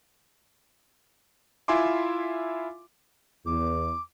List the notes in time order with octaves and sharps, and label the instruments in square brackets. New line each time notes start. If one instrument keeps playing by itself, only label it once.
[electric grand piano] E4 F4 E5 G#5 C6 D6
[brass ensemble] E2 [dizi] D6